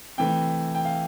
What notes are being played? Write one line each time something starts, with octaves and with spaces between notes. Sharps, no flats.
C3 E3 A3 G5
G5
F5